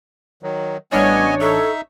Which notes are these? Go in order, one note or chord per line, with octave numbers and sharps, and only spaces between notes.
D#3 F#3
A1 G3 B3 D4 C#5 D#5 G#5
D#4 A4 E5